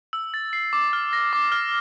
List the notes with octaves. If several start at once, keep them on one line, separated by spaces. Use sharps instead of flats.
E6
A6
C7
D6
F6
A#6
D6
F6